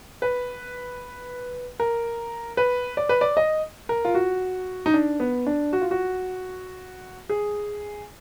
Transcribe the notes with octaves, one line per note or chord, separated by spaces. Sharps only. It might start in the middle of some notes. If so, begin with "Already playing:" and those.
B4
A#4
B4
D5
B4
D5
D#5
A#4
F4
F#4
D#4
D4
B3
D4
F#4
F4
F#4
G#4